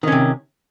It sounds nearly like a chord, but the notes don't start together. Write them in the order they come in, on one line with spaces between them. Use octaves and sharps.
D#3 C#4 C3